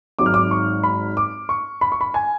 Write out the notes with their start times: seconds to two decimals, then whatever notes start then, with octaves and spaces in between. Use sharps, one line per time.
0.19 G#1 G#2 F#3 D6
0.26 F6
0.34 D6
0.51 C#6
0.83 B5
1.17 D6
1.49 C#6
1.81 B5
1.92 C#6
2.01 B5
2.14 G#5